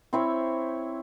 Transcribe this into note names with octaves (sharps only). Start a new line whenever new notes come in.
C4 E4 C#5